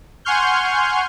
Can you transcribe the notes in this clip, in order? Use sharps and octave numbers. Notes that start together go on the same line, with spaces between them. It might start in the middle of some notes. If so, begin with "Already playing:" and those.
F#5 G#5 C6 C#6 F6 G6